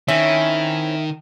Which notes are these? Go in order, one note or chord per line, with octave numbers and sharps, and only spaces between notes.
D#3 C4 C#4 E4 E5